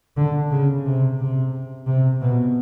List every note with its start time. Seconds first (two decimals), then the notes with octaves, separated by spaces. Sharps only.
0.17 D3
0.51 C#3
0.85 C3
1.19 C3
1.86 C3
2.21 B2